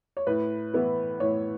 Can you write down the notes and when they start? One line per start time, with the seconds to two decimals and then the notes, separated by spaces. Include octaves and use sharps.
0.17 C#5
0.27 A2 B4
0.73 E3 B3 E4
1.20 A2 C#5